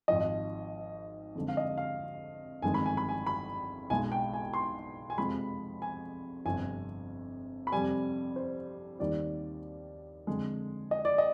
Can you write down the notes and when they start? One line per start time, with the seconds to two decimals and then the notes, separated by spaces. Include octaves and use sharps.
0.08 G#1 G#2 F3 D#5
1.35 F2 D3 G#3
1.48 F5
1.57 D#5
1.78 F5
2.62 G1 F2 D#3 G#3 G#5
2.74 B5
2.86 G#5
2.97 B5
3.09 G#5
3.27 B5
3.90 B1 B2 G#3 G#5
4.12 G5
4.33 G#5
4.54 C6
5.10 G#5
5.18 F2 C3 F3 G#3 B5
5.82 G#5
6.45 G1 F2 C3 G#5
7.67 B5
7.72 F2 C3 G3 G#5
8.36 C5
8.99 D#2 D#3 G3 D5
10.27 F2 D3 G#3
10.91 D#5
11.05 D5
11.18 D#5